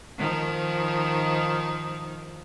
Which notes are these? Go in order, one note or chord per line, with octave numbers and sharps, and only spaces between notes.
D#3 F3 D#4